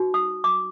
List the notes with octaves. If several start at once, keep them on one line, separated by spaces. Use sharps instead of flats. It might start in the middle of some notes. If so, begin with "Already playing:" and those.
Already playing: D#4 F#4 B4
D#6
D6